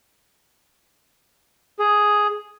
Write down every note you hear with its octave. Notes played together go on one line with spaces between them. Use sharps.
G#4